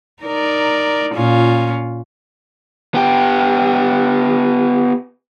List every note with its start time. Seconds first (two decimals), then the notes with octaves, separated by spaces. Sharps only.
0.23 D#4 A#4 D5
1.14 A#2 C#4 F4
2.95 B3 G4